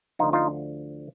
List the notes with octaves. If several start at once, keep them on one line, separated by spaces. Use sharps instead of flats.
D2 D3 F3 D#4 F4
D#4 F4